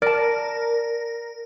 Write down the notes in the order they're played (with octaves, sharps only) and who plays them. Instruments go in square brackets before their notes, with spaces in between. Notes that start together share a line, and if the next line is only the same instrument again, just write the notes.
[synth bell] A#4 [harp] D5 A5